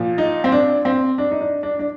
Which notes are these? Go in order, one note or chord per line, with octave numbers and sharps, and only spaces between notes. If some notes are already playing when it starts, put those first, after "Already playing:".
Already playing: A#2 F3
D#4
C4
D4
C4
D4
D#4
D4
D4
D4